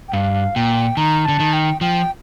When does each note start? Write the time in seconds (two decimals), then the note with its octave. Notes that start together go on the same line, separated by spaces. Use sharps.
0.09 G5
0.13 G2 F5
0.56 A#2 G5
0.97 D#3 A#5
1.25 D3 A5
1.40 D#3
1.53 G5
1.81 F3 G5